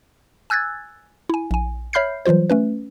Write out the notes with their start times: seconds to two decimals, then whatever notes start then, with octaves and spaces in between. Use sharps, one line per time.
0.50 G#5 E6 F#6 G#6 A6
1.29 E4 G#5
1.51 A#1 G#5
1.93 C#5 E5 B5 F6 G6 C7
2.26 E3 F#3 G3 F4 C5
2.50 A3 C#4 B4